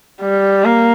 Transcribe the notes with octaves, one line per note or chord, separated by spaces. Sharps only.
G3
A#3